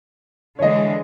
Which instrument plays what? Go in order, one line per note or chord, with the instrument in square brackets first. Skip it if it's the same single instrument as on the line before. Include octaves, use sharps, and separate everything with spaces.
[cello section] D3 E3 G#3 [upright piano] C#5 D#5